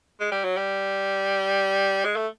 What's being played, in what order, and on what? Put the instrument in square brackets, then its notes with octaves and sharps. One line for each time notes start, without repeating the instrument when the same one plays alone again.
[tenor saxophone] G#3
G3
F#3
G3
G#3
A3